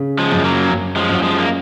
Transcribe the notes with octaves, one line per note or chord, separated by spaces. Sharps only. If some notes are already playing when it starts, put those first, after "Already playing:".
Already playing: C#3
F3 G#3
F#2
F#3 A#3
F#2
F3 G#3
F#2
F#3
F3 G#3
A#3